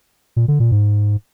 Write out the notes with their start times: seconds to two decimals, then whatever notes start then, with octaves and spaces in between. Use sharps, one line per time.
0.36 A#2
0.48 D3
0.60 A#2
0.72 G#2